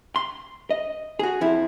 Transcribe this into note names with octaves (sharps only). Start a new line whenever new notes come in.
C6
D#5
F#4 G#4
F2 F3 E4